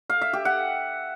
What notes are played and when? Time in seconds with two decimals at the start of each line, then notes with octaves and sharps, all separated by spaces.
0.09 F5
0.21 E5
0.33 G4
0.45 F#5